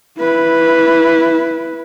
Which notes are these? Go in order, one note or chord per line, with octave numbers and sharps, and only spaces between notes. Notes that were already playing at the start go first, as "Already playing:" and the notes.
E4 B4